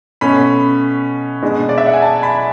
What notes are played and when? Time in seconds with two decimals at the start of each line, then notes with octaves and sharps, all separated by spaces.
0.21 B2 A3 C#4 B5
1.42 B2 G#3 D4
1.69 D5
1.78 E5
1.86 F#5
1.94 G#5
2.02 A5
2.23 B5